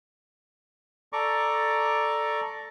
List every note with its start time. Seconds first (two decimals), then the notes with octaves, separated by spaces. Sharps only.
1.13 A4 D5 A#5 C#6 D6